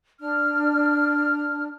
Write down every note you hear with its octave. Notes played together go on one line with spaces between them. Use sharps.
D4 F6